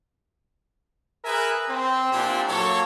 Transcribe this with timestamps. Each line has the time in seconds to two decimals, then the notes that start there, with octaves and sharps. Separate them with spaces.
1.25 G#4 A#4 B4 E5 G#5
1.68 C4
2.12 A#2 F3 D4 E4 G4
2.48 F#3 A#3 A4 C#5